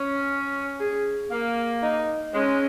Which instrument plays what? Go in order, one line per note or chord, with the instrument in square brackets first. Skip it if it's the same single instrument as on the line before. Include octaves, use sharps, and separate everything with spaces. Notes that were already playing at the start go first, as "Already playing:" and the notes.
Already playing: [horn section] C#4
[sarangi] G#4
[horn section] A#3
[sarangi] D#4
[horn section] G#3 [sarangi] C#4